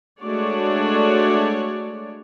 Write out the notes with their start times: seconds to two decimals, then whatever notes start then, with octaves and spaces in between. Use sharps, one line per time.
0.20 G#3 A3 D4 F#4 C#5 D5